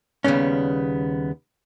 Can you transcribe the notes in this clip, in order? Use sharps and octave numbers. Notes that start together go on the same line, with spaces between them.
D#2 C#3 F3 G3 B3 C#4